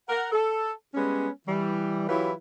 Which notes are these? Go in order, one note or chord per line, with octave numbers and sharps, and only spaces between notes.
A#4 F#5
A4
G3 G#3 B3 C#4
E3 G3
E3 F#3 E4 F4 G4 B4